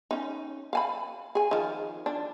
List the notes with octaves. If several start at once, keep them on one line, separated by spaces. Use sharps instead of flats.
C#4 D#4
F5 G#5 B5
G#4 G#5
D#3 F3
D4